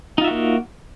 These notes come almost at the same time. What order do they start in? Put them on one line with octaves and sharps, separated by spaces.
D#4 F4 E5 F#4 A#3